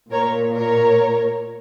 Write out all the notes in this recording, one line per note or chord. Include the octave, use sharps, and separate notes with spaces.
A#2 A#4 C#5
A#4 C#5